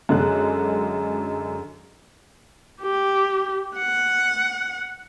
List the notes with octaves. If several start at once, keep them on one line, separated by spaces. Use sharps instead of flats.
F#2 D3 G#3 G#4 A4 F#6
G4
F#5